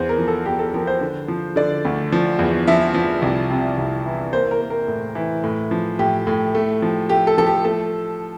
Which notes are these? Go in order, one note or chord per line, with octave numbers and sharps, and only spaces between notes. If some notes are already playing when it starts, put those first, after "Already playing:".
Already playing: E2 C5
A#4
F3
A4
E2 G4
A4
F3 A#4
C5
D3
F3
D3 D5
D2
F3
E2
F3 E5
F3
C2
C3
C2
E3
A#3 C5
A#4
A#3
A#4
A2
E3
A2
F3
A2 G4
A2
A3
F3
A3 G4
A4
F3 A4
G4
A3 A4